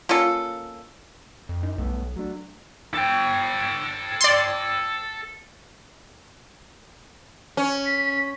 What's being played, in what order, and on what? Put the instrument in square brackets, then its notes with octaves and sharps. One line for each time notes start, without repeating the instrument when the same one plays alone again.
[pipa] A#3 C#4 F4 A4
[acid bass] F2
[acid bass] F#2 [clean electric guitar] D#4
[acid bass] B1 [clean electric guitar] G2 A3 B3
[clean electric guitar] F#3 A3 D4
[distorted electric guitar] A4 G5
[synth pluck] D5 C6
[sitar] C#4
[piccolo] B6